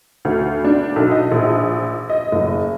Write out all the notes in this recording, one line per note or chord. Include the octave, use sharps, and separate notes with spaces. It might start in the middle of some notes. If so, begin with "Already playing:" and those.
D2
D4
B1
D#5
A#1
D#5
F#1